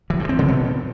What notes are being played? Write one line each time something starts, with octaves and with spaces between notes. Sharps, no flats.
E3
G2
C4
C#3
B2